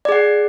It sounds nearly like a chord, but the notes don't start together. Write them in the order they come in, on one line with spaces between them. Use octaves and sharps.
D5 G#4 F#5